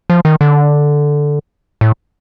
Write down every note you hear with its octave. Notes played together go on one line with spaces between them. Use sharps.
F3
D#3
D3
A2